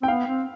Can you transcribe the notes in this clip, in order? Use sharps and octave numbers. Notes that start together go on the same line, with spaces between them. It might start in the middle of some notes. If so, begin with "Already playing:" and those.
C4 G5
B3 F5
C4